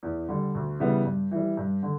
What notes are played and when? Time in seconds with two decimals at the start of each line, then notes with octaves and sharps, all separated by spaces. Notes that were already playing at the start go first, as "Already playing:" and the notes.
0.03 E2
0.29 D3 G3
0.55 D2
0.80 C#3 E3 G3 B3
1.05 G2
1.31 E3 G3
1.57 G2
1.83 D3